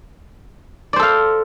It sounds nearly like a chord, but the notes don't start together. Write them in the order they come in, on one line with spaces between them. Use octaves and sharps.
D5 C5 A4 F5